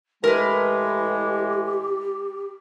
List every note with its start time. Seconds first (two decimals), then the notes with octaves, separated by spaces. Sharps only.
0.24 A2 E3 G#3 G4 A#4 B4